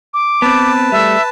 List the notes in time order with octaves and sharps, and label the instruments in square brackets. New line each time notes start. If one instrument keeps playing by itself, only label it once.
[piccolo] D6
[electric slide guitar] B3 C4 [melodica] B4 A5
[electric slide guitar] G3 A3 [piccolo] E5